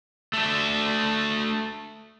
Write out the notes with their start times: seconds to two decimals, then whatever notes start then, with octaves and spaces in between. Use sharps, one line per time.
0.33 A3 D4